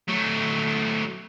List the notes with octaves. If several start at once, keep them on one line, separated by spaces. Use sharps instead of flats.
F#3 A3